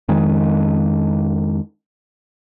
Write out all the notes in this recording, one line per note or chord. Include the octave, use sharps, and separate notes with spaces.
F2 D#3 G#3